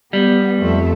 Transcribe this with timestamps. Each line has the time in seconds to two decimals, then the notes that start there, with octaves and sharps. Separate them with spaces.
0.13 G3 B3
0.60 F2 A3 E5